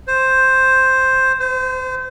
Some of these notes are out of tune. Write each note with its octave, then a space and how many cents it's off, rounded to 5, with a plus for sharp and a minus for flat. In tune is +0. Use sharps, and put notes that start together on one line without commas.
C5 +5
C5 -30